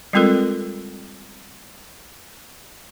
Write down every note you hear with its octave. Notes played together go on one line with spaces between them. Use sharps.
G3 G#3 C4 F4 A4 A#4